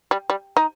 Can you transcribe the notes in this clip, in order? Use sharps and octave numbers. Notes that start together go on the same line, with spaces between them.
G3
G3
D#4